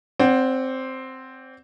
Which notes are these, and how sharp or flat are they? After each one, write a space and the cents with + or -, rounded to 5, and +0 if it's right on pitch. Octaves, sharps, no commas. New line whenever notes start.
C4 +0 D5 -35 F#5 +10